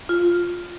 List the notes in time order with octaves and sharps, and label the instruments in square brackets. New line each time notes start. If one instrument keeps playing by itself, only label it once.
[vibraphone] F4